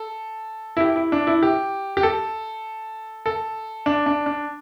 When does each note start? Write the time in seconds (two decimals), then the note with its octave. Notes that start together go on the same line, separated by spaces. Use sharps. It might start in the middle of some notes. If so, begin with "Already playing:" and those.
Already playing: A4
0.77 E4
0.80 G4
0.96 E4
1.12 D4
1.27 E4
1.43 G4
1.97 G4
2.03 A4
3.26 A4
3.86 D4
4.06 D4
4.26 D4